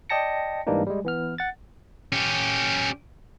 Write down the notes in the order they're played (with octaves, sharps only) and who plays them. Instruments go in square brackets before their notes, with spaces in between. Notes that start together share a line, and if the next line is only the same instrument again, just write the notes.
[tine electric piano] D5 D#5 G5 A5 A#6 C#7
G#2 E3 G3 A#3 D4 D#4
G3 G#3
E3 B3 F6
F#5 A6
[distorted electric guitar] C#4 G4